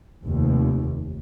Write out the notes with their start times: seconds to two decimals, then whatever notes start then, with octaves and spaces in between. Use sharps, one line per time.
0.24 F1 D#2